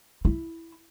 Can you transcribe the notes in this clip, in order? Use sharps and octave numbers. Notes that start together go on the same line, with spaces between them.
E4